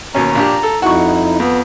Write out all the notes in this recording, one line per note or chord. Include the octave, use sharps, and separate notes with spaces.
D#2 B2 C#4 A#5
A#1 D4 G4
A4
F2 D#4 E4 F#4 C#6
F2 B3